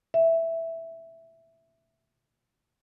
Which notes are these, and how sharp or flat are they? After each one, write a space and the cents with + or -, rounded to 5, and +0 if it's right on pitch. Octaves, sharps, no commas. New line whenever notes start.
E5 +0